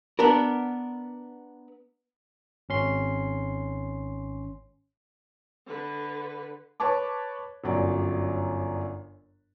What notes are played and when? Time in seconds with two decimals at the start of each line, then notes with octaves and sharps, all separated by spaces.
0.19 B3 D4 A#4
2.69 G#1 C#4 C6
5.66 D3 B4
6.80 B4 C#5 A5 D6
7.64 G1 F#2 F#3 D5